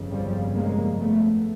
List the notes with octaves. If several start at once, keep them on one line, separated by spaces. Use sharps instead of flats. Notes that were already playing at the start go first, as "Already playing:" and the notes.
Already playing: G1 F2 C#3
F3 G3
G#3 A#3
A3 B3